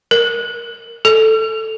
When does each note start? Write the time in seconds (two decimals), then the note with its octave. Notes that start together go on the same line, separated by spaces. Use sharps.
0.11 A#4
1.05 A4